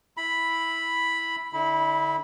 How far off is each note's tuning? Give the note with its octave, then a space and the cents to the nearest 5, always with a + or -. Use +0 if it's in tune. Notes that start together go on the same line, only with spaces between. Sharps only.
E4 +0 B5 +0
D3 +0 E4 -25 B5 +0